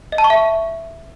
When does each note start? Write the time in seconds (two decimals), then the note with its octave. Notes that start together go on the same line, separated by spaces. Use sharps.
0.12 D#5
0.18 A5
0.24 C#6
0.30 E5